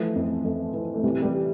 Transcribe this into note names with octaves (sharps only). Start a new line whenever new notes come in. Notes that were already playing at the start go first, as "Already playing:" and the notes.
Already playing: E3 F3 A3
F2
F2
E3
A3
C3 E3 G3
E3 G3